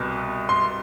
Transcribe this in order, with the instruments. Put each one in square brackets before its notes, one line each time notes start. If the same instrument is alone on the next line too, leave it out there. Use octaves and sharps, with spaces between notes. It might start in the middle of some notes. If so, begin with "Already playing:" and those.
Already playing: [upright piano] C2 B2 B3
C6